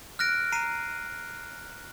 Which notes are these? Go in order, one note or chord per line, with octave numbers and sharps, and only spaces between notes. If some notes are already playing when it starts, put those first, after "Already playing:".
F6 F#6 A#6 D7
A#5 C7 D#7